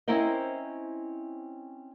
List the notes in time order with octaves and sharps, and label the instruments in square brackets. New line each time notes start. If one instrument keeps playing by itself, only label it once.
[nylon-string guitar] C4 C#4 E4 A#4 C5 D#5